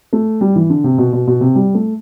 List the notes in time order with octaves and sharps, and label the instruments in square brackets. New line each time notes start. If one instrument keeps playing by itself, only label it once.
[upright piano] A3
G3
E3
D3
C3
B2
B2
B2
C3
G3
A3